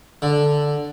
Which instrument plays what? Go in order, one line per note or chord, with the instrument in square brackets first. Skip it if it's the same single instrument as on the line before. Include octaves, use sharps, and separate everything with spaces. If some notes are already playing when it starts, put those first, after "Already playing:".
[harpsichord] D3